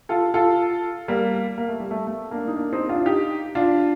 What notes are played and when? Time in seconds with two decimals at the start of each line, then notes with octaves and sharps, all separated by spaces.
0.09 F4 A4
0.34 F4 A4
1.08 G3 A#3
1.58 A#3
1.69 A3
1.80 G3
1.91 A3
2.07 A3
2.31 A#3 D4
2.47 D#4
2.56 A#3 D4
2.73 C4 D#4
2.89 D4 F4
2.99 F4
3.06 D#4 G4
3.55 D4 F4